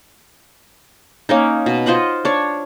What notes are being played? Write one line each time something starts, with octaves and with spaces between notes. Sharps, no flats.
A#3 C#4 D#4
B2
F4 C5 D#5 F#5
D4 C#5